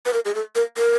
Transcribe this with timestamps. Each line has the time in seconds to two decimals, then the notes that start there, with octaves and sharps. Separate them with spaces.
0.06 B4
0.13 A#4
0.25 G#4
0.35 A4
0.55 A#4
0.77 A#4